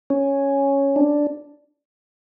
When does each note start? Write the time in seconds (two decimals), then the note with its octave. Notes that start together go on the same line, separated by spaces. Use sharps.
0.10 C#4
0.96 D4